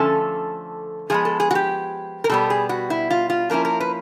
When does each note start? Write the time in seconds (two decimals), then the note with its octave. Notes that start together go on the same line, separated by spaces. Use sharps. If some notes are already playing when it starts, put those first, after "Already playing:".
Already playing: D3 F3 A3 C#4 A4
1.10 F3 G#3 B3 G#4
1.25 A4
1.40 G#4
1.51 F#4
1.55 G4
2.24 A#4
2.29 B2 G3 B3 A4
2.50 G#4
2.69 F#4
2.90 E4
3.10 F4
3.30 F4
3.50 F3 A#3 C#4 E4 A#4
3.65 A#4
3.80 B4